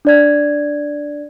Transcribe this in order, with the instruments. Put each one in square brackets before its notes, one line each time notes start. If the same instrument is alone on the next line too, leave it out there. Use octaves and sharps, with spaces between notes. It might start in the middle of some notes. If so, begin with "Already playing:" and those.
[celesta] D4 D5 G#6